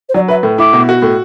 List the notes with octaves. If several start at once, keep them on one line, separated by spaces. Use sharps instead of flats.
C5
F#3 D5
B4 E5
A2
E4 D6
B2
F#4
A2